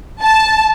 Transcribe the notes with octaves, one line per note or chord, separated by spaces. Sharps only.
A5